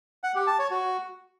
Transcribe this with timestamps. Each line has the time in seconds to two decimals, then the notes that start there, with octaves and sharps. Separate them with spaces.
0.24 F#5
0.35 G4
0.47 A5
0.59 C#5
0.71 F#4